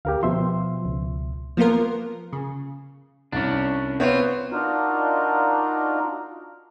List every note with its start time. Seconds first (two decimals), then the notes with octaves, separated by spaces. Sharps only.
0.05 D2 G4 A#4 F5
0.23 B2 F3 E5 C6
0.85 C#2
1.57 F3 A#3 B3 F4 A#4
2.33 C#3
3.32 C2 C#4 D4
4.00 B3 C4 F4 C#5
4.52 D4 D#4 F4 F#4 A#4